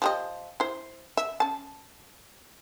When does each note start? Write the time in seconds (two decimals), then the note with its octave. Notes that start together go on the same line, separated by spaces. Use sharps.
0.02 F3 G4 D#5
0.60 E4 C5
1.17 E5
1.40 C#4 A5